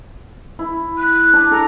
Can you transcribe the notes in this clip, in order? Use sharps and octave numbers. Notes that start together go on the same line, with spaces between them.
E4
F#6
D4
A4 A#5